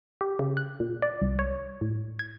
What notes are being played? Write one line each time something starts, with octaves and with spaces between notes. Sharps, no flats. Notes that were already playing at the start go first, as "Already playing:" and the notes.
G4
C#3
F#6
A#2
D5
C2
C#5
A2
G#6